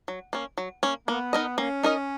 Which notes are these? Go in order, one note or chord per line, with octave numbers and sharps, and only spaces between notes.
F#3
A#3 C#4
F#3
A#3 C#4
A#3 B3
D#4 A#4 D#5
A#3 C#4
D#4 A#4 D#5